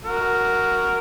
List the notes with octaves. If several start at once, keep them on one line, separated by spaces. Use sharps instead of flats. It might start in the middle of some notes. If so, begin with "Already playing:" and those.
F#4 A#4